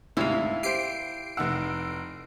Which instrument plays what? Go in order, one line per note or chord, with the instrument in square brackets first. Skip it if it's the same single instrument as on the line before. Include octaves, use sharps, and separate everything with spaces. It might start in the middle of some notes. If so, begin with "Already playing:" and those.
[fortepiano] D2 G#2 C3 [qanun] E4 F5
[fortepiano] G4 C5 [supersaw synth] C7 D7
[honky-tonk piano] F1 E6 [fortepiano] D#4 F#5